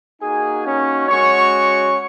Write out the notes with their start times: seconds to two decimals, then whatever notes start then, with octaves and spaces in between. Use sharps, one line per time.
0.21 A#3 D#4 F#4 G#4 G#5
0.65 C#4 C#5
1.08 G#3 C#4 F#4 C#5 C#6